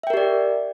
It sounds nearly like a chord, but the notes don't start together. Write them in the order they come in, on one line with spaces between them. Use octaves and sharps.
E5 G5 A#4 G4 D5